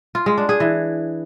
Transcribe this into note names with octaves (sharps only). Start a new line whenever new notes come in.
F4
G#3
D4
G#4
E3